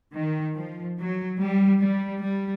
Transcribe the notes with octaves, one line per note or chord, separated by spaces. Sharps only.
D#3
F3
F#3
G3
G3
G3